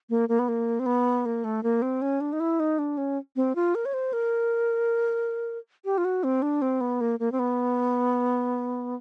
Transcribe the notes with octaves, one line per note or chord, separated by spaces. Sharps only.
A#3
A#3
B3
A#3
C4
B3
A#3
A3
A#3
C4
C#4
D4
D#4
E4
D#4
D4
C#4
C4
F4
A#4
C#5
C5
A#4
G4
F4
F#4
C4
D4
C4
B3
A#3
A#3
C4
B3